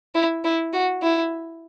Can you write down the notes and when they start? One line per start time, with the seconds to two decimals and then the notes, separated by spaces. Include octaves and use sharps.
0.15 E4
0.44 E4
0.73 F#4
1.03 E4